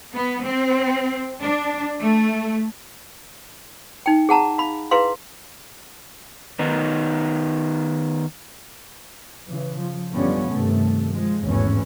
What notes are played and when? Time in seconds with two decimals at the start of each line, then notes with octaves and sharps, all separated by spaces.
0.14 B3
0.44 C4
1.40 D4
2.01 A3
4.06 D#4 G5
4.29 G#4 F#5 A5 A#5
4.58 F5 B5
4.91 E4 G#4 B4 F5 C6
6.59 D#3 B3 D#4
9.49 C#3 E3
9.79 F3
10.13 F#2 D3 F3 G3 B3 C#4
10.49 G2 C3 D#3 A3
11.12 F3 G#3
11.44 G#1 E2 A2 E3 C#4